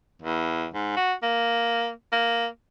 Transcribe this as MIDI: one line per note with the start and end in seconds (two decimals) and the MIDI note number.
0.22 0.67 40
0.74 0.94 44
0.97 1.13 66
1.23 1.90 58
2.12 2.46 58